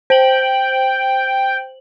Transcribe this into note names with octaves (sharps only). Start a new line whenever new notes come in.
C5 G5 F#7